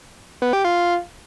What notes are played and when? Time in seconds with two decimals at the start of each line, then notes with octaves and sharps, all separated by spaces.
0.42 B3
0.53 G4
0.64 F4